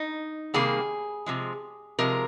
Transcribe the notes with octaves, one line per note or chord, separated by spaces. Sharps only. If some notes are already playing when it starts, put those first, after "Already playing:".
Already playing: D#4
C3 D#3 G3 A#3 G#4
C3 F3 G#3
C3 F3 G#3 A#4